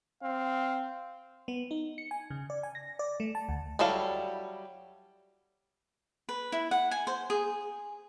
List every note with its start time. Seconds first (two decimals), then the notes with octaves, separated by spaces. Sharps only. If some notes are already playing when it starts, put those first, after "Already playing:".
0.23 C4 F5
1.48 B3
1.71 D#4
1.98 C#7
2.11 G#5
2.30 C#3
2.50 D5
2.63 G#5
2.75 A#6
2.99 D5
3.20 A3
3.35 A5
3.49 D2
3.79 F#3 G3 E4 A4 F5
6.29 B4
6.52 E4
6.71 F#5
6.91 G#5
7.07 C5
7.30 G#4